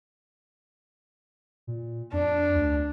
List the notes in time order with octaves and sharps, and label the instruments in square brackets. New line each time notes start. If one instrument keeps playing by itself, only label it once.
[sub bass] A#2
[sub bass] F2 [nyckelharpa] D4
[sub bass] D2